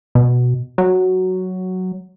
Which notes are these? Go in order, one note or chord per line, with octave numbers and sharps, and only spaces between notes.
B2
F#3